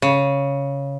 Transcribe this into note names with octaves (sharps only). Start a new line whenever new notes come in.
C#3